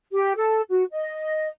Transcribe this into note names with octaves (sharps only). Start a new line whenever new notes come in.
G4
A4
F#4
D#5